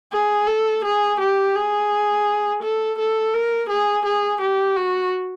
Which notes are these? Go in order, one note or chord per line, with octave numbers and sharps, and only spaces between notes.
G#4
A4
G#4
G4
G#4
A4
A4
A#4
G#4
G#4
G4
F#4